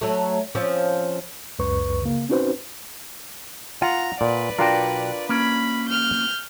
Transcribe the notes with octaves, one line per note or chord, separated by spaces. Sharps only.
F#3 A3
F3 C4 C#4
C#2 F#2 B4 C#6
C#3 A#3
C4 C#4 D#4 F#4 B4 C5
F4 F#5 A#5
A#2 B4 D5
B1 D4 F4 F#4 A#4 G5
A#3 C#4 B5
F6 G6